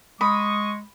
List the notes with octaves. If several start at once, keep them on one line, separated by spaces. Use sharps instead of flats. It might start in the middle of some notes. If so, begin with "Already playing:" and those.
G#3 B5 C#6 D#6